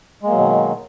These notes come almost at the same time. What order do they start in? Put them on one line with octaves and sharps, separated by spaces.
G#3 A#3 F#3 B2 D#3